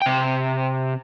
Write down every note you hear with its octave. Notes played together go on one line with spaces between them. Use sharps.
C3 G5